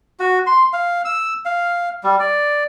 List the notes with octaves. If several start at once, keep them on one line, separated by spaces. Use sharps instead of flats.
F#4
C6
F5
E6
F5
G3
D5